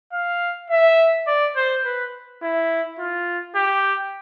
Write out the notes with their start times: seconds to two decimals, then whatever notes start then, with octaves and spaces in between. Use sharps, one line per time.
0.12 F5
0.70 E5
1.27 D5
1.56 C5
1.85 B4
2.42 E4
2.98 F4
3.55 G4